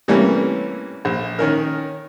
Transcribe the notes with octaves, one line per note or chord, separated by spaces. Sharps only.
C3 E3 G3 A3 A#3 C#4
A#1
D#3 C#4 A#4